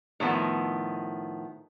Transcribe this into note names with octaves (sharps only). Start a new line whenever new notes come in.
A2 D#3 F3 B3